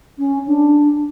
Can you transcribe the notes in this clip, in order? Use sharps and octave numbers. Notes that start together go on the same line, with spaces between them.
C#4
D4